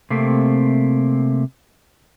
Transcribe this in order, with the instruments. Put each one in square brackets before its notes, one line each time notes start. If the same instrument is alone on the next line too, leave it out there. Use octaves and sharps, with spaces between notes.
[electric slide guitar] C3 A3 A#3 C4